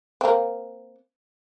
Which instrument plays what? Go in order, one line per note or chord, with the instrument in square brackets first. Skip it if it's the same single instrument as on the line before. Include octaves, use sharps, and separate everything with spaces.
[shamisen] A#3 C4